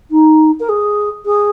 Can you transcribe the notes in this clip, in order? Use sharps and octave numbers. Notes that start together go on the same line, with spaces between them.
D#4
A#4
G#4
G#4